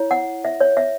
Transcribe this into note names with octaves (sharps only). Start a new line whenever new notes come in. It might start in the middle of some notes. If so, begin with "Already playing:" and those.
Already playing: E4 C#5
F#5
E5
C#5
E5